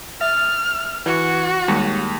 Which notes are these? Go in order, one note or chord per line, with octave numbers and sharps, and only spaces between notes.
E5 D#6 F6 A6
E3 F#4 F#5
D#2 G3 G#3 A#3